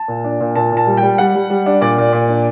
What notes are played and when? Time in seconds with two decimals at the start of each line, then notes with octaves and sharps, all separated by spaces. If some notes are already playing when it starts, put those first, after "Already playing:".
Already playing: A5
0.08 A#2
0.24 D4
0.40 A#2
0.56 A#2 A5
0.72 A#2 A5
0.87 G3
0.97 G5
1.03 G3
1.18 G3 F#5
1.35 G3
1.50 G3
1.66 D4
1.81 A#2 D5
1.98 A#2
2.13 A#2
2.29 D4